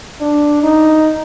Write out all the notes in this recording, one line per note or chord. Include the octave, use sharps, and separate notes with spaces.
D4
D#4